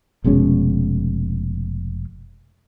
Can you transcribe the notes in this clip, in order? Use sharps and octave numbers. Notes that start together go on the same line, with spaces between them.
F1 B2 G#3 C#4